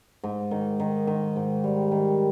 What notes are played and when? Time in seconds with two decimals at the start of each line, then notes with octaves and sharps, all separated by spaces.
0.23 G#2
0.51 D#3
0.80 D#3
1.07 D#3
1.36 G#2
1.64 G3
1.91 D#3